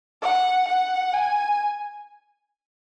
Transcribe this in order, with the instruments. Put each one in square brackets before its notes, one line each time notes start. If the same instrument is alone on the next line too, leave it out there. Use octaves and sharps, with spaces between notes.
[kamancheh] F#5
F#5
G#5